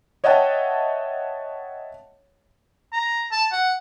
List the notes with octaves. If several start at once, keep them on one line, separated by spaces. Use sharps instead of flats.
C#5 D#5 E5 F#5 G5 A5
A#5
A5
F#5